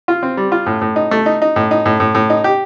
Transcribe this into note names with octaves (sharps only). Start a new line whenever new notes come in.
F4
C4
G3
F4
A2
A2
D#4
A3
D#4
D#4
A2
D#4
A2
A2
A2
D#4
G4